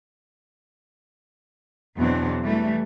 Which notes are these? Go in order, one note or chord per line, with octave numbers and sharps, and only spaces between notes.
E2 B2 F#3 C4 D4
E3 G3 A3